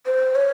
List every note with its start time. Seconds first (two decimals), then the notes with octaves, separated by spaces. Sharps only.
0.06 C5
0.35 C#5